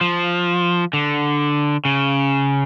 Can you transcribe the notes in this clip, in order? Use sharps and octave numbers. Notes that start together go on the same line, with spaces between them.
F3
D3
C#3